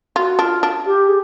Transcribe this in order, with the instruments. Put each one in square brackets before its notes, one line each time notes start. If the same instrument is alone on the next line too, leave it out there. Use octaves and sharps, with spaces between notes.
[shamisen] F4 [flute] F#4
[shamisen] D4 [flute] F4
[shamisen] D4
[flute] G4
G#4